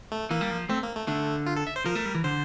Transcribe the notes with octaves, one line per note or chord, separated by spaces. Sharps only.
A3
E3 A#3
G3
F3
A3 C4
A#3
A3
D3 A3
F4
A4
E5
C5
F3 A#4
A3
G3
E3
D3 C5